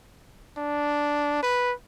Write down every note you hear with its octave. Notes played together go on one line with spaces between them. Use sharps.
D4
B4